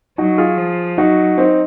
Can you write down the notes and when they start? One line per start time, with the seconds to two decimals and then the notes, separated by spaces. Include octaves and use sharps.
0.18 F#3 D#4 F#4
0.38 F4 G#4
0.57 F3
0.98 F#3 D#4 F#4
1.38 C4 D#4